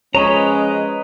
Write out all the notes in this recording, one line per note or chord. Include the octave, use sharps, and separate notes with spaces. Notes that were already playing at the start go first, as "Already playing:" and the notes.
F3 G#3 C#4 B4 C#5 D#5 A#5